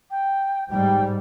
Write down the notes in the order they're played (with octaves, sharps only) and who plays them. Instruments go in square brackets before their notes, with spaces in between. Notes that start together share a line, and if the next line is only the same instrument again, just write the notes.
[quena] G5
[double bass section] G#2 G3 [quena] G5